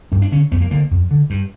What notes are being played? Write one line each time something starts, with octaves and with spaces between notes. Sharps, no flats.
G2 C#4
D4
D3 C#4
F2 B3
A#3
D3 A#3
F2
D3
G2